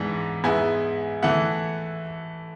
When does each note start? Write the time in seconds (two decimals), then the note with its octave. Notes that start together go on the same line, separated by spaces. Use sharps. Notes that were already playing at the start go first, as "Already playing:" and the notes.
Already playing: G#2 E3 B3 D4
0.44 G#2 G#3 B3 E4 G#5
1.22 E3 A3 E4 F#5